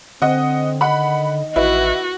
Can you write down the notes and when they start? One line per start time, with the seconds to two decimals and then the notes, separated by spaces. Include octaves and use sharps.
0.22 D3 C4 D#5 F#5
0.81 D#3 D#5 F#5 B5
1.56 A1 E4 F#4 B4